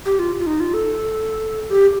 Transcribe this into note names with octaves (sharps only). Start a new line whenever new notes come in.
G4
F4
F4
D#4
F4
A4
G4